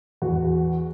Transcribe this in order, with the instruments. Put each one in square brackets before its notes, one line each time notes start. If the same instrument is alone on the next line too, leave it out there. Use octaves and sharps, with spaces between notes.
[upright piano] E2 F#4